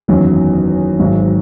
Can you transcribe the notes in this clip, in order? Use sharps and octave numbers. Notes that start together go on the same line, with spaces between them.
F#1 E2 D#3 F#3 C#4
G#1 G#2 D#3 F#3